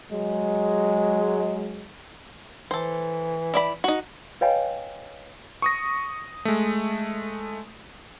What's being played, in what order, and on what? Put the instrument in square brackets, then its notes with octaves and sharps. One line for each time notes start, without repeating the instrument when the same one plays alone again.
[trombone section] F#3 G#3
[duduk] E3 [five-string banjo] A4 C5
[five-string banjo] E4 D5 B5
D#4 F#4
[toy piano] B4 C#5 D#5 F5 G5 G#5
[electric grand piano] C#6 D#6 A#6
G#3 A3